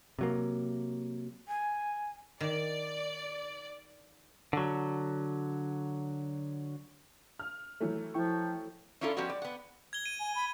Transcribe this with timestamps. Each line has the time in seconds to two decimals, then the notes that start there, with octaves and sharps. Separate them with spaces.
0.19 C3 F#3 A#3
1.48 G#5
2.41 D#3 D5
4.53 D3 F#3
7.40 F6
7.81 E3 F#3 A3
8.14 F3 E4 G5 C#6
9.01 C#4 D4 E4 F4 G#4 A4
9.17 F3 G3 B3 C#4 F#4
9.30 D5
9.42 B3 F#5
9.93 G#6 G7
10.06 D#7
10.20 G#5
10.35 B5